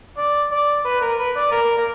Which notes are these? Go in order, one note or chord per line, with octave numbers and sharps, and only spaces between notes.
D5
D5
B4
A#4
B4
D5
A#4
A#4